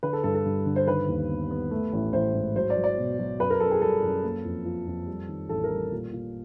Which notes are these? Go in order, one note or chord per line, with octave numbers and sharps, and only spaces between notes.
D3 B4
A4
G2 A4
A4
G2
D3
C5
D#3 B4
D#2
B3
B3
A3
A1
A1 C5
G#2
F#3 C5
D5
F#3
D5
B2
F#3
F#2 B4
A#4
F#2 A4
G#4
G3 A4
F#2
A#3
F2
F3
F2
G3
D#3
A1 A4
A#4
G3
A#2
A#2